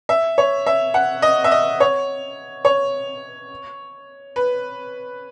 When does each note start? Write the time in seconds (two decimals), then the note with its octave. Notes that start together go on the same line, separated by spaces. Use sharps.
0.09 E5
0.38 C#5
0.66 E5
0.94 F#5
1.22 D#5
1.44 E5
1.51 D#5
1.80 C#5
2.65 C#5
4.36 B4